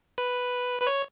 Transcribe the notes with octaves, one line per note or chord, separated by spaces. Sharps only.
B4
B4
C#5